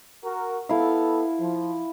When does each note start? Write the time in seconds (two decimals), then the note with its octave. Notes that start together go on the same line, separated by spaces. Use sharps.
0.24 F#4 A#4
0.69 B3 E4 A4 F5
1.40 F3